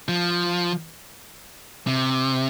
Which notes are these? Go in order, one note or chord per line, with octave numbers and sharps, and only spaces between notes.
F3
C3